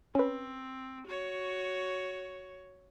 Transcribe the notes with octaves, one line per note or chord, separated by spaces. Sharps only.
C4 C#4 B4
F#4 C#5